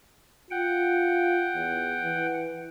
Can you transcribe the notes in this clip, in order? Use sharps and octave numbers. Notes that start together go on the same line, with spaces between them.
F4 F#5 G5
E2
E3